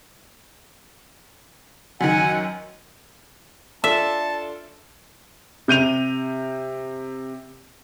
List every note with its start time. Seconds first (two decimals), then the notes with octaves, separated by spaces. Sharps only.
2.01 F#2 D#3 F#5 G#5
3.84 D4 F4 A4 E5 A5
5.68 C3 G6 D#7 F7